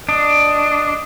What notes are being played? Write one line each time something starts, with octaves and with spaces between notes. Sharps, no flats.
D4 D#5